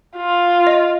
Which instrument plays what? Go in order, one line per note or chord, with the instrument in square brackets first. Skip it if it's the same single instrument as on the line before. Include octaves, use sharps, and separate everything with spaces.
[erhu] F4
[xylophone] D#5